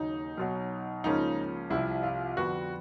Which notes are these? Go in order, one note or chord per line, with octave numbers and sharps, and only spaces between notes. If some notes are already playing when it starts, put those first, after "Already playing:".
Already playing: D#2 C#3 F#3 D#4
B1 B2 F#3
C#2 C#3 F3 A#3 C#4 D#4
C2 C3 F3 E4
F4
F2 D3 G3 B3 F#4